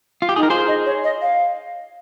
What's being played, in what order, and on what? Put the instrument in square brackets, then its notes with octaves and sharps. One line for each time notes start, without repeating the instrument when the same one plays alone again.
[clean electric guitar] F4
G4
[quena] D#4 [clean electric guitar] G#4
[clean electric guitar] A#4
[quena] F4 [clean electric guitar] G#4 C5
[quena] D#5
C#5
D#5
F5